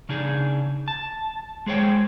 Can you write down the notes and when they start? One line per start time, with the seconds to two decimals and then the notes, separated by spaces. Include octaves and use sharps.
0.09 C#3 D4 D#4 G#4
0.88 A5
1.66 G#3 G#4 C5 C#5 G5